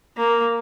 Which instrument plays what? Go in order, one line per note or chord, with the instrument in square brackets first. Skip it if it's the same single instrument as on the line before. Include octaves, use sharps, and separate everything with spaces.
[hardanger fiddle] A#3